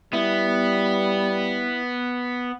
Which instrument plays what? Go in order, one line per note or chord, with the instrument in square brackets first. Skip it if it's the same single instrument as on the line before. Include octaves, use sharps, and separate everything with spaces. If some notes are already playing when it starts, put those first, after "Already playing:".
[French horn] G3 [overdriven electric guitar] B3 [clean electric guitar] E4